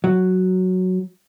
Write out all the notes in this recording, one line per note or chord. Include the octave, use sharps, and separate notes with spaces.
F#3